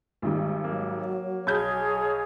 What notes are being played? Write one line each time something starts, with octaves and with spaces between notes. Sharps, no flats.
G#1 D#3 G3
F#3 A#3
B1 G#4 C#5 B5 G6 G#6